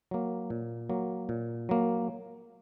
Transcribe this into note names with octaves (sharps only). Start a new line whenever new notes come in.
F#3 A#3
A#2
F#3 A#3
A#2
F#3 A#3